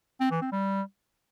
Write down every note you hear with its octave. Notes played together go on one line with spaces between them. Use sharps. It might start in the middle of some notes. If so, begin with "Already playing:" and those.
C4
E3
C4
G3